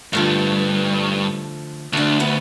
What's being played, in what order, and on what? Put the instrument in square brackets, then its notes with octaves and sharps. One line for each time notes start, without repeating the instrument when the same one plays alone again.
[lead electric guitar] G2 [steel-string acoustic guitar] D3 F3 A3
[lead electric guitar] D2 [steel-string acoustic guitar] D3 D4
[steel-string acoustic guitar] D#2 B3 B4